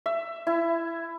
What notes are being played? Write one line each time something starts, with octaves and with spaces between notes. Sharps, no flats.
E5
E4